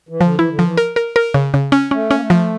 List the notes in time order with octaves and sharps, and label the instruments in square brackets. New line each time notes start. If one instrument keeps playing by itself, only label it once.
[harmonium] E3
[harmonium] D3 [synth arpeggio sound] F3
[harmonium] E3 [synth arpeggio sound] E4
[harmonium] D3
[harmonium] E3 [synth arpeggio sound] F3
[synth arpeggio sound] A#4
A#4
A#4
C#3
C#3
C#4
[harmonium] A3 [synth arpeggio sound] C#4
[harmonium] A#3 [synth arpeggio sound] C#4
[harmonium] A3
[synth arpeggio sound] F3